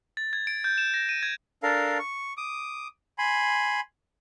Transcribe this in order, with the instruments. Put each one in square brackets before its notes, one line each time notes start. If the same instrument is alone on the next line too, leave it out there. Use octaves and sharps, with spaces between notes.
[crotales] A6
G#6
D7
G6
E7
A#6
D#7
G#6
[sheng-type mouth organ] D4 A4 A#4 F5
C#6
D6 D#6
G#5 B5 C6